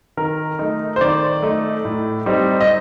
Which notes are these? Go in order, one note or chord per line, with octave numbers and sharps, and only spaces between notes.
D#3 A#4
A3 D#4
C5
D#3 D5
A3 D#4
A2
G3 C4 D#4
D#5